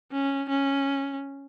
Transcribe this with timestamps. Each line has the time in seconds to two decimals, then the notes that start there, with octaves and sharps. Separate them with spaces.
0.12 C#4
0.49 C#4